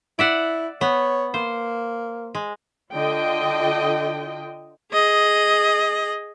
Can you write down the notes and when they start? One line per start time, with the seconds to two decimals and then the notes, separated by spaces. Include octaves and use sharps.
0.19 E4 D5 E5 F#5
0.81 B3 C#5
1.34 A#3 C5
2.35 G#3
2.92 D3 F4 D#5 G5
4.92 G#4 D#5